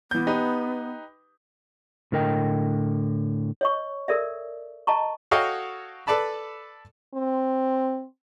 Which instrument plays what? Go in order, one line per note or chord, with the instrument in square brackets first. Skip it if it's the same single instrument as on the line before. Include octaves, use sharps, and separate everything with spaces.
[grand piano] E3 G6 [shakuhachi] B3
[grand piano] D#4 G4 B4
[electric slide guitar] A2 D3 A#4 D#5 G5
[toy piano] C#5 D#5 C#6
A4 A#4 D5 E5
D#5 A5 A#5 C#6
[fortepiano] F#4 A4 C#5 D#5 F5 G5
A4 B4 D5 A5 B5
[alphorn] C4